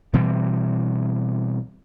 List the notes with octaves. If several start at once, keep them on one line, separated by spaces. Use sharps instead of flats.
B2 E3 G3 C4